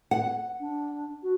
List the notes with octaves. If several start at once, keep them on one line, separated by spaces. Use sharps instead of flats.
F#5
D4
F#4